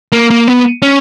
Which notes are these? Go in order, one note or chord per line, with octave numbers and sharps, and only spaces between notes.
A#3
A#3
B3
C#4